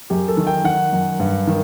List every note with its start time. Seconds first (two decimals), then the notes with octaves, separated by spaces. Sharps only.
0.10 F#2 G4
0.28 A4
0.37 D#3
0.47 G5
0.64 D#3 F#5
0.92 F#2
1.20 G2
1.47 D#3